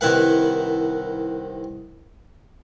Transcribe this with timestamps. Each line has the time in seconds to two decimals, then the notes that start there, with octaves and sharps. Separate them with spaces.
0.01 C2 D#3 E4 B4 F#5